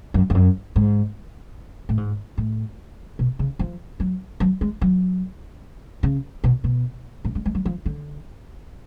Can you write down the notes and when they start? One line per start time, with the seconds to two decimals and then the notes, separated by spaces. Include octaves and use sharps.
0.14 F#2
0.30 F2
0.35 F#2
0.76 G#2
1.89 A2
1.97 G#2
2.38 A2
3.19 B2
3.39 C#3
3.59 F3
4.00 F#3
4.40 F#3
4.61 G#3
4.81 F#3
6.03 C#3
6.44 B2
6.64 B2
7.25 A2
7.35 G#3
7.46 G#3
7.55 F#3
7.65 F3
7.86 D3